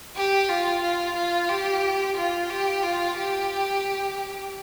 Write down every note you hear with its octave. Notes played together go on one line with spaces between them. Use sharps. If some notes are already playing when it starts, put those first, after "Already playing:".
G4
F4
F4
F4
G4
F4
G4
F4
G4